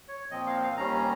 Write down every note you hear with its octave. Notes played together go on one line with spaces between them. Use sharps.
C#5
A#2 F3 C4 D#5
F5
F5
D#2 D#3 G3 C#4 A#5